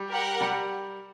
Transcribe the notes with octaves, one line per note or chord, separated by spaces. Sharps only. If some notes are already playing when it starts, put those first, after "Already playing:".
Already playing: G3
G4 A#4 F#5
G3